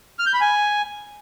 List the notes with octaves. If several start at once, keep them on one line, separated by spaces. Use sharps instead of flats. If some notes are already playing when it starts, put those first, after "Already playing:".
F6
G6
B5
G#5